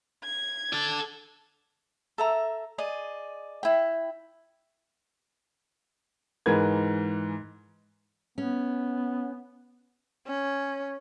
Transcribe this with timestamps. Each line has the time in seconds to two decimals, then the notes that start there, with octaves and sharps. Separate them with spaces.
0.24 G#6
0.73 A4 D5
2.18 A4 E5 A#5
2.78 G#4 D5 D#5
3.63 E4 G5
6.46 G#2 E3 A#4 B4 G#6
8.38 B3 C#4
10.26 C#4